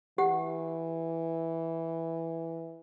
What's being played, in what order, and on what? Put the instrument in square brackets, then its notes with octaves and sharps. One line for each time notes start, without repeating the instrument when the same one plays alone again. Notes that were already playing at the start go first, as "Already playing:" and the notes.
[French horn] E3 [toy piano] G4 F#5